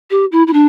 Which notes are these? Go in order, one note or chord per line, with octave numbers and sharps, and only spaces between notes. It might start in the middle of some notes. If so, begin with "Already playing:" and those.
G4
E4
E4
D4